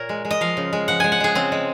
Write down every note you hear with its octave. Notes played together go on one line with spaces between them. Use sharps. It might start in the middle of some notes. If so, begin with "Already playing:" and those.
Already playing: A#2 A#4 C#5
G#3
G#3
D#5
F3 F5
C#3
G#3
F3 F#5
G#3 G#5
F#5
G#3 G#4
C#3 C4
G#3